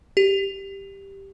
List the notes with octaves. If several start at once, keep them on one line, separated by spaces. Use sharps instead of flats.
G4